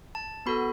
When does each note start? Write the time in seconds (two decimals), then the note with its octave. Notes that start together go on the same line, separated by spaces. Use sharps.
0.15 A5
0.46 B3 F#4 A4 B5